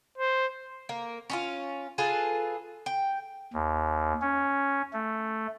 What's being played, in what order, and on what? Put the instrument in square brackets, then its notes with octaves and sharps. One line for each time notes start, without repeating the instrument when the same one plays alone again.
[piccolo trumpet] C5
[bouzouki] A#3
C#4 D#4 F4
F4 G#4 A4 B4
G5
[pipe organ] D#2
C#4
A3